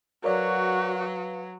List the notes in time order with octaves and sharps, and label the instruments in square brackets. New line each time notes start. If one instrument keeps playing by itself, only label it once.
[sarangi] F#3 [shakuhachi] F#4 [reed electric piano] A#4 C#5 D5 [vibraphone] B4 F5